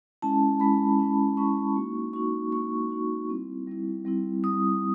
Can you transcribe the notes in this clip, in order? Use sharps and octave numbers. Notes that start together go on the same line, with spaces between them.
G#3 C#4 E4 A5
G#3 C#4 E4 B5
G#3 C#4 E4
G#3 C#4 E4 C#6
A#3 D#4 F#4
A#3 D#4 F#4 C#6
A#3 D#4 F#4 C#6
A#3 D#4 F#4
G3 C4 E4
G3 C4 E4
G3 C4 E4
G3 C4 E4 D#6